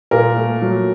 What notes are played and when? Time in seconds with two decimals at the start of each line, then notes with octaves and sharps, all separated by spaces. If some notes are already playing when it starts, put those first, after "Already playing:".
0.11 A#2 A#4
0.37 A3
0.62 F#3